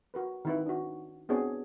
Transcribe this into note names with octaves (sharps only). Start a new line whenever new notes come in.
F#4 A#4 B4
D#3 C4 E4 F4 B4
D4 F#4
B3 C4 D4 F#4 G#4 C#5